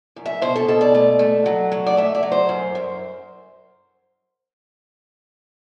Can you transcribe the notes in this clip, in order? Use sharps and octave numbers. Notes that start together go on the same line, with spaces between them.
F#2
E5
B2 C5
A4
B2 A4
D5
A3
A3
F#3
F#3
D5
A3 E5
D5
F#3
C5
F#2
F#2